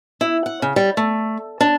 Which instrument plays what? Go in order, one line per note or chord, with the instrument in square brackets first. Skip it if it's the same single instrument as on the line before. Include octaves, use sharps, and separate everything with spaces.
[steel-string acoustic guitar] E4
F#5
C#3
G3
A3
D4